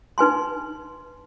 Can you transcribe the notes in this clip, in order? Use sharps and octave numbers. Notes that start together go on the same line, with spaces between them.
D#4 B4 G#5 C6